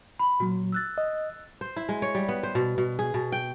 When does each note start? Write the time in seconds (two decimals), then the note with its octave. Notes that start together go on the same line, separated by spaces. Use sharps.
0.19 B5
0.40 A#2 F#3 F#4
0.72 E6 F#6 A6
0.98 D#5
1.61 C5
1.76 E4
1.89 G#3
2.02 C#5
2.15 G3
2.29 B3
2.43 C5
2.55 B2
2.78 B2
2.99 G#4
3.14 B2
3.32 G5